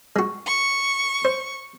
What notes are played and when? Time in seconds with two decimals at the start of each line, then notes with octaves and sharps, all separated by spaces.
0.16 G#3 F#4
0.47 C#6
1.25 C5